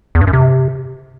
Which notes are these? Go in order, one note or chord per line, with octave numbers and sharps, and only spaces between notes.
E2
G2
F#2
C3